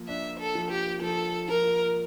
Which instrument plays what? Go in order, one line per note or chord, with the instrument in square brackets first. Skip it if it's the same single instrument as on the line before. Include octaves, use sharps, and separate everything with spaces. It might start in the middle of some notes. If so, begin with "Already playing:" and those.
Already playing: [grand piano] F3 A#3
[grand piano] D4 [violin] E5
[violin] A4
[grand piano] F3
[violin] G4
[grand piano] F3 [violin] A4
[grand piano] F3 [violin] A#4